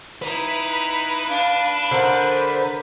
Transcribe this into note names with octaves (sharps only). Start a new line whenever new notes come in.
D#4 E4 B4
D4 F5
D3 A#4 C5